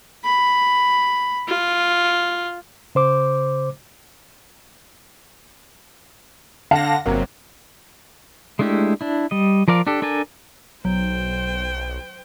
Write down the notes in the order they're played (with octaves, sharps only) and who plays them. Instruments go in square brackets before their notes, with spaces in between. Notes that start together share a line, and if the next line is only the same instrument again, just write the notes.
[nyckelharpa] B5
F4
[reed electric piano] C#3 C5 D6
[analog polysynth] D3 A#6 [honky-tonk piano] F5 F#5 A5
[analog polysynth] G1 C3 F#3 [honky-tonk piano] A#3
[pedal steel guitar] G#3 A3 D4 E4 G4
D4 E4
G3 D#5
F3 A#4 D5 F5
D4 G4 A4
D4 A4 A#4 G#5 A5
[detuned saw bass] B1 [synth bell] F#3 [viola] C5 G5